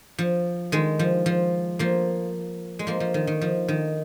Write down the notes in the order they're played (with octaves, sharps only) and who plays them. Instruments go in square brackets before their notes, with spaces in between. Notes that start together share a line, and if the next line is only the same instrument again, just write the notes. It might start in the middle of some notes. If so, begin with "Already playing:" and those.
[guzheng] F3
D#3 G#3
F3
F3
F3 A#3
G#3
F3 A#3
F3
D#3
D#3
F3
D#3